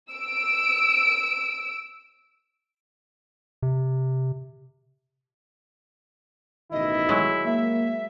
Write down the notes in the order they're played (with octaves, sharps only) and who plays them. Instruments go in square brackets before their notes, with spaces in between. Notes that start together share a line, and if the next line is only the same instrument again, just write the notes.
[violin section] E6 D7
[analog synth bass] C3
[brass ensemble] A1 B2 D#3 [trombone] E4 [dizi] D#5
[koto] F#3 G#3
[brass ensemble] A#3 [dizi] E5